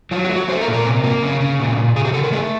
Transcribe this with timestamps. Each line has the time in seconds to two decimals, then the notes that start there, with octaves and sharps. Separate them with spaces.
0.11 F#3 F4
0.25 F#4
0.29 A3
0.36 F#4
0.48 A3 C5
0.61 A#4
0.68 A#2
0.73 A#4
0.85 C3
1.04 A#3
1.23 C#3
1.40 C#3
1.60 A#2
1.77 A#2
1.96 C#3 G#4
2.05 G4
2.14 C#3 A4
2.24 A#4
2.32 A3 G#4